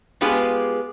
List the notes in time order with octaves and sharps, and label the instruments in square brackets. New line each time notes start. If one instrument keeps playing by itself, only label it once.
[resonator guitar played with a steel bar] G#3 B3 F4 G4 G#4 B4